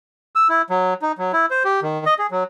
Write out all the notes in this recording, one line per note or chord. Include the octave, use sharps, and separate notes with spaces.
E6
E4
F#3
D#4
F#3
E4
C5
G4
D#3
D#5
G#4
F#3